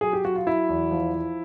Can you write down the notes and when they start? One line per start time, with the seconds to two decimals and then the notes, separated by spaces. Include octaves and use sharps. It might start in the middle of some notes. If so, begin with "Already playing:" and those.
0.01 F#3 G#4
0.13 G4
0.25 F#3 F#4
0.36 F4
0.47 F#3 E4
0.69 E2
0.91 F3
1.14 F3